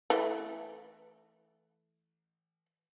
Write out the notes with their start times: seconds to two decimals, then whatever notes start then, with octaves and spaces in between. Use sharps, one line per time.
0.10 E3 A3